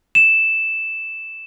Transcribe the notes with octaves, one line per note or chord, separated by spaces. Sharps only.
E7